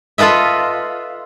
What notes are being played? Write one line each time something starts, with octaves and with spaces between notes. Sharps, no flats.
F4 A4 B4 D#5 E5